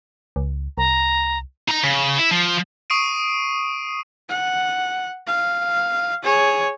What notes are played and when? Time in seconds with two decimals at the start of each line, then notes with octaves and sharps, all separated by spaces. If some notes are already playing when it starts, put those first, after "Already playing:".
0.36 C#2
0.78 C2 A#5
1.69 D#4 A#5
1.84 C#3
2.18 E4
2.31 F3
2.90 C#6 D#6 C7 D7 D#7
4.29 F#5
5.27 F5
6.23 G#4 C#5